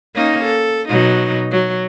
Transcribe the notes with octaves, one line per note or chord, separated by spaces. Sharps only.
A#3 C#4 D#4
A4
B2 F#3 D#4
F#3